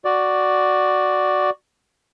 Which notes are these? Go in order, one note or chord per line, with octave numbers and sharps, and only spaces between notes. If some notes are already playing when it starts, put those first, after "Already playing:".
F#4 D5